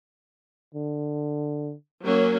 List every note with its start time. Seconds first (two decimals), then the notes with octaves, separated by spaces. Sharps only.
0.75 D3
2.03 F#3 A#3 C#4